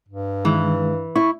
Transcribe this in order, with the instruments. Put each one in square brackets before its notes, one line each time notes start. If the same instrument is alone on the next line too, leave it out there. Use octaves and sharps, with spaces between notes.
[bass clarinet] G2
[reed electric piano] D#3 G#3 [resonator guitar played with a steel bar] E3
[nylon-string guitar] E4 [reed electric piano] C#6